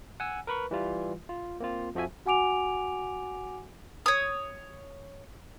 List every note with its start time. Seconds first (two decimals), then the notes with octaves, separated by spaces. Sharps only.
0.20 F#5 G#5 E6
0.47 A#4 B4 B5 C#6
0.71 E3 G3 F4
1.29 F4
1.60 A#3 C4 F4
1.95 F2 F3 F#4 E5 G#5
2.26 F#4 F#5 G#5 D6 D7 F7
4.06 C#5 D#6